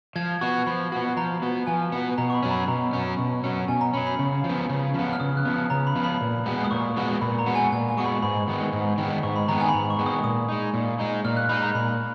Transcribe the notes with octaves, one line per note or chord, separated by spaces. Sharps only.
F3 G#6
B3 F#4 C#6
F3 B5
B3 F#4
F3 A#5
B3 F#4
F3 G#5
B3 F#4
B2 A#5
C#6
B5
F#3 C#4
B5
B2 A#5
F#3 C#4
B2
F#3 C#4
B2 G#5
A#5
F#3 C#4 B5
B5
C#3
F3
B3
C#3
F3 B3
F6
C#3 D#6
F#6
F3 B3
D#6
C#3 A#5
B5
F3 B3
B5
A#2
G#3 B3 F#4
D#6
A#2 C#6
G#3 B3 F#4
A#2 B5
A#5
G#3 B3 F#4
G#5
A#2 G#5
G#5
G#3 B3 F#4 C#6
B5
G#2 B5
D#3 G#3 B3
G#2
D#3 G#3 B3
G#2 C#6
B5
D#3 G#3 B3 A#5
G#5
B5
G#2 A#5
C#6
D#3 G#3 B3
D#6
A#2 D#6
G#3 D#4
A#2
G#3 D#4
A#2 F6
F#6
G#3 D#4 B5
A#5
A#2 B5